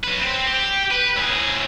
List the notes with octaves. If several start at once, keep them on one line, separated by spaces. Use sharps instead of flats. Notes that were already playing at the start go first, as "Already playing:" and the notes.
F#3 B4
C4
G4
B4
A2 G#4